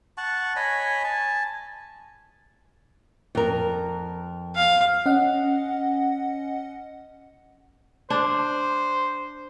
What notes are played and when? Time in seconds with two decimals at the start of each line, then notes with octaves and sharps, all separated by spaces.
0.18 F#5 A5 C#6
0.56 C#5 D#5 G#5 B5
1.04 G#5 A5
3.35 F2 A#4
4.56 F5
5.06 C#4 D#5 F#5
8.10 D4 C5